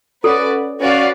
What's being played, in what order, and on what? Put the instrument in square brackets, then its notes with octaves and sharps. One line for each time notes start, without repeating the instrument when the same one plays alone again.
[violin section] C#4 F#4 B4 D5 [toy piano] A4
[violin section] C#4 F#4 B4 D5 F5